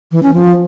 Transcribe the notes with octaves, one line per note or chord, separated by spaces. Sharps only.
E3
C#4
F3